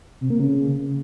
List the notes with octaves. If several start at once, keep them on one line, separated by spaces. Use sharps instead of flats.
C3
A#3
C#3